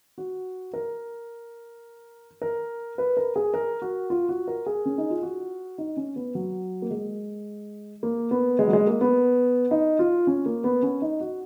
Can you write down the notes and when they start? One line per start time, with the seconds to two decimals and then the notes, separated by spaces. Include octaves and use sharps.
0.18 F#4
0.73 A#4
2.42 A#4
2.98 B4
3.17 A#4
3.36 G#4
3.54 A#4
3.82 F#4
4.10 F4
4.29 F#4
4.48 A#4
4.66 G#4
4.86 C#4
4.98 D#4
5.10 F4
5.23 F#4
5.78 D#4
5.97 C#4
6.16 B3
6.35 F#3
6.82 A#3
6.91 G#3
8.03 A#3
8.31 B3
8.59 G#3
8.67 F#3
8.73 G#3
8.87 A#3
9.01 B3
9.71 D#4
9.99 F4
10.27 C#4
10.46 A#3
10.64 B3
10.83 C#4
11.02 D#4
11.20 F#4